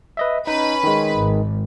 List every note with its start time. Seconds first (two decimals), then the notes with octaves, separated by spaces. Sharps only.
0.17 B4 D#5 E5
0.47 C#4 D#4 B4 B5
0.84 D#3 G#3
1.15 G#1